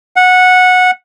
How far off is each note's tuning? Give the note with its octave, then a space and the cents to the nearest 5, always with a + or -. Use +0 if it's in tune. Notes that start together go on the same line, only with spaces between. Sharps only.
F#5 -15